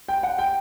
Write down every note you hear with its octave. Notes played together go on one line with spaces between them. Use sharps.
G5
F#5
G5